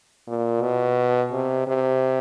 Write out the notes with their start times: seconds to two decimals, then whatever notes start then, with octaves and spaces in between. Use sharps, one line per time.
0.27 A#2
0.62 B2
1.32 C3
1.67 C3